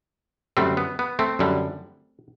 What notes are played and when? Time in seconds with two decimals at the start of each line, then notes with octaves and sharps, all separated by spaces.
0.57 F#2 D3 G3 A3 C4
0.77 B3
0.99 B3
1.19 A3 C4
1.39 F#2 D3 G3